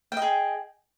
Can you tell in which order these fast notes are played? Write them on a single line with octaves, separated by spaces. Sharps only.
G5 D#5 G#4